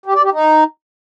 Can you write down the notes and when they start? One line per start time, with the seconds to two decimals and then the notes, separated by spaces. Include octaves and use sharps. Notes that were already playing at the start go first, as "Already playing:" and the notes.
0.06 G4
0.14 D5
0.23 G4
0.32 D#4